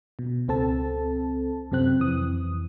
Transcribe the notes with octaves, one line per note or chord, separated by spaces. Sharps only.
B2
C#2 C4 A4 A5
F#2 C3 C4 F#6
F2 E3 D#6